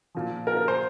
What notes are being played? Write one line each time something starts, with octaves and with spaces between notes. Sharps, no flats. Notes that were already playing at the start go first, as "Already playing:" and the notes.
A#2 F3
A#4
A#4
C5